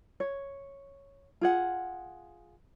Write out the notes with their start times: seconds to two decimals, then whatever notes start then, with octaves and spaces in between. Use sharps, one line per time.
0.20 C#5
1.41 F4 G#4 F#5